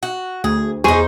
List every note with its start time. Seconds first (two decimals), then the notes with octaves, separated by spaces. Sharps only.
0.03 F#4
0.44 D2 G#4
0.84 E2 D#4 G#4 C5 C#6